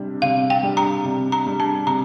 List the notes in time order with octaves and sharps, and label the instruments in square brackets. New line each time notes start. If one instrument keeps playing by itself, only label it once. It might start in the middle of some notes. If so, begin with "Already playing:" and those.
Already playing: [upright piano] C3 G3 D4
[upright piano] C3 [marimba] F5
[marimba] G5
[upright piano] G3 D4
[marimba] A#5
[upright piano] C3
[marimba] A#5
[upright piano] G3 D4
[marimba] A5
[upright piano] C3 [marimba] A#5